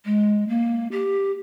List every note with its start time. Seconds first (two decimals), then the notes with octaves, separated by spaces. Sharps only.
0.05 G#3
0.48 A#3
0.92 G4